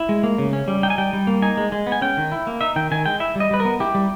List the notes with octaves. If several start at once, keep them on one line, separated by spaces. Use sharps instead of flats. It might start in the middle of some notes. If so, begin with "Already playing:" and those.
Already playing: E4
G#3
A#3
C#3
C#4
G3
D#4 G5
G#5
G3 G5
G3
A#3
D#4 G#5
G#3
G#3
B3
G#5
C#4 G5
D#3
E4
A#3
D#4 E5
D#3 G5
D#3 G#5
G#3 G5
E4 E5
G3 D#5
G3 B4
A#4
B3
E4 G4
G3